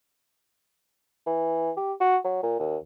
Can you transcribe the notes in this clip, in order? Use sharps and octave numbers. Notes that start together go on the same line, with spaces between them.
E3
G4
F#4
F#3
A#2
D#2